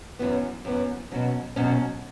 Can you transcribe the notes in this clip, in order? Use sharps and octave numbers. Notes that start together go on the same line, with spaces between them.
F#2 E3 B3
F#2 E3 B3
B2 F#3 C#4
B2 F#3 C#4